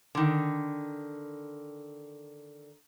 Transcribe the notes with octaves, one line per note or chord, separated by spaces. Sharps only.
D3 D#3